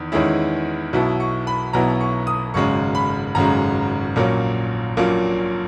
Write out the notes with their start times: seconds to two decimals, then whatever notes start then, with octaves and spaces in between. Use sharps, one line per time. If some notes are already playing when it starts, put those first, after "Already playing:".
Already playing: E2 D#3
0.12 E2 D#3 G#3 C#4 E4
0.93 B1 B2 F#3 B3 E4
1.20 C#6
1.47 B5
1.73 B1 B2 F#3 B3 E4 A#5
2.01 C#6
2.27 D#6
2.54 G#1 F#2 C#3 G#3 C#6
2.95 B5
3.35 G#1 F#2 C#3 G#3 A#5
4.16 A#1 A#2 F#3 A#3 C#4
4.97 A#1 A#2 F#3 A#3 C#4